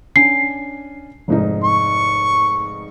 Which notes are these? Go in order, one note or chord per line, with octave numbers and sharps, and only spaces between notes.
C#4 D4 G#5 C7
F1 G#2 D#4
C#6